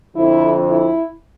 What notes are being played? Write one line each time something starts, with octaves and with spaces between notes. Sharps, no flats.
F2 D3 F3 E4
E4